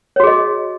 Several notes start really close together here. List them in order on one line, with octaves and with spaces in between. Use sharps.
C#5 F#4 G#4 D#5